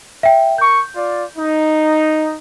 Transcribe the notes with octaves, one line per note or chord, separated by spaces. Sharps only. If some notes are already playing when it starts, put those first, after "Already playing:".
E5 G5
A#4 C#6 G6
F4 D5
D#4